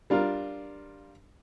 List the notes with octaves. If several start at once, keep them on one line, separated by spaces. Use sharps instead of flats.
G3 D4 F4 A#4